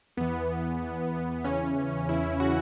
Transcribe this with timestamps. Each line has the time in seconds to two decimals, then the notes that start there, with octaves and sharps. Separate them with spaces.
0.17 E2 E3 B3
0.81 E2 E3
1.44 E2 C#3 E3 C#4
2.08 E2 C#3 E3 E4
2.40 F#4